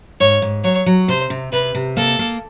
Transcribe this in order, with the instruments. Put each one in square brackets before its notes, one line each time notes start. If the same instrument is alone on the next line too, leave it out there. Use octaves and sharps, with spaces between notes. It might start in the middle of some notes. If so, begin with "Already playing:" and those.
[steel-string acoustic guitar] G#2 [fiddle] C#5
[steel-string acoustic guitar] G#2
[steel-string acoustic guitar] F#3 [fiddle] C#5
[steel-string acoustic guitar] F#3
[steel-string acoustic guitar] C3 [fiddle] C5
[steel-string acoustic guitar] C3
[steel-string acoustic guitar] C3 [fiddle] B4
[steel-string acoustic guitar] C3
[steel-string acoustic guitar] A#3 [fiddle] A4
[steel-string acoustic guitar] A#3